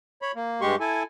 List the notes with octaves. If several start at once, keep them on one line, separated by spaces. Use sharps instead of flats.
C#5 B5
A#3
G2 G#3 G4 C6 C#6
E4 A4 G#5